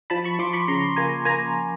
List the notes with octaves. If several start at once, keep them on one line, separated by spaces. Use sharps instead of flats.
F3 A5 B5
B5 C#6
F3 C6 D6
B5 C#6
C#3 A#5 C6
A#3 G#5 A#5
A#3 G#5 A#5